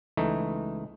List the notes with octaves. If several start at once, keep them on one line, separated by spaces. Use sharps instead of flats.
C#2 E3 A3 D#4